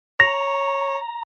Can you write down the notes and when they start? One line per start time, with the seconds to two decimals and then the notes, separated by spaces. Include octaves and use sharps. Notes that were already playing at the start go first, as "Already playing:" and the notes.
0.20 C#5 A#5 A#6